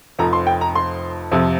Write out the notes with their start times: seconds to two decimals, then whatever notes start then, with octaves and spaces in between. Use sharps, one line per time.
0.19 F1 F2 F3 A#5
0.33 C6
0.47 G5
0.61 A#5
0.75 C6
1.31 F2 C3 F3